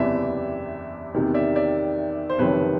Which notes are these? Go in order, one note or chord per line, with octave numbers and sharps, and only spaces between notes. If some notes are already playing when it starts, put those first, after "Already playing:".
Already playing: F#1 E2 C3 E3 D5 E5
E2 C3 D#3
D5 E5
D5 E5
C5
F#1 F2 C3 D#3 B4 C#5